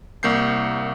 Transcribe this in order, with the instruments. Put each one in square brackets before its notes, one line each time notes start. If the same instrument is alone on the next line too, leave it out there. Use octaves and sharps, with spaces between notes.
[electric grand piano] C2 A#3 G6 C7